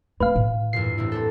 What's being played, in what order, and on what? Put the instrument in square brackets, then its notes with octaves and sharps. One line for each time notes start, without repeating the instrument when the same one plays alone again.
[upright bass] A3 C4 [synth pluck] B4 F5
[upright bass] A2 E3
[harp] E2 G2 A#2 [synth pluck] C7
[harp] A1 C4 E4
C4 D4 A4